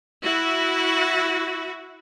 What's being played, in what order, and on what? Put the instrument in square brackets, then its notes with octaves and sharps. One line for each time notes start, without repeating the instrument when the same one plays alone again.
[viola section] E4 F#4